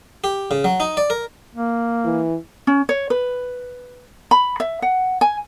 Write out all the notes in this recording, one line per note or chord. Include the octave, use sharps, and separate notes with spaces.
G4
C#3
F#3
D#4
D5
A#4
A#3
E3
C#4
C#5
B4
B5
E5
F#5
G#5